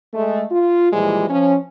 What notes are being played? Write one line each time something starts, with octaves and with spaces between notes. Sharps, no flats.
G#3 A3
F4
A#2 E3 F3 G3 G#3
F3 C#4